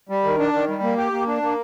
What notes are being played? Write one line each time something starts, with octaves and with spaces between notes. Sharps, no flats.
G3
D#3
D4
D#3
G3
A#3
G4
A#3
D4
A#3